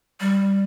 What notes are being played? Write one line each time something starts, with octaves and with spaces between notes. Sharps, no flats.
G3